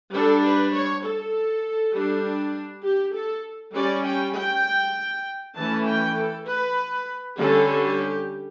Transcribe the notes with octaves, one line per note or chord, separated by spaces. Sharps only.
G3 D4 A4
B4
C#5
A4
G3 D4
G4
A4
G3 C#4 D5
G5
G5
E3 A3 C#4 A5
G5
A4
B4
D3 G3 C#4 A4
G4